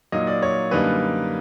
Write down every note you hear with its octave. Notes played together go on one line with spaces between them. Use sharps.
A#2 F#3 A#3 D#4 D#5
D5
C#5
F#2 D3 G3 A#3 D#4 B4